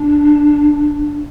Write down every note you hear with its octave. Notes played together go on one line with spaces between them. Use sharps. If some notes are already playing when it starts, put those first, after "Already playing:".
Already playing: D4